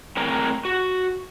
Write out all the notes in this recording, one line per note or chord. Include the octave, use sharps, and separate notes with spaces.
A2 C4 G#4 A#4 G5 A#5
F#4